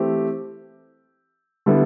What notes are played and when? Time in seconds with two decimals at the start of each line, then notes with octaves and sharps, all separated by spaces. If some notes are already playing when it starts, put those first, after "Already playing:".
Already playing: E3 A3 C4 G4
1.66 D3 G3 B3 E4 A4